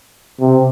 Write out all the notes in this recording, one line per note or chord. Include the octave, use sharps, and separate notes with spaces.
C3